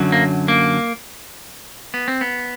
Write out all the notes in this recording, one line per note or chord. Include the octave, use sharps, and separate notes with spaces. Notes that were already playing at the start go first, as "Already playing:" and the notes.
Already playing: F#2 D3 F#3
A#3
A#3
B3
C4
B3